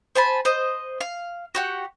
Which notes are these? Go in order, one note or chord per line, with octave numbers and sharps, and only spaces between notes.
C5 G#5 A5 B5
C5 D#5
F5
F#4 G4 F#5